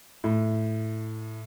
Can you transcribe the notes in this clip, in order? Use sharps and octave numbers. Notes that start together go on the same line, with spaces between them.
A2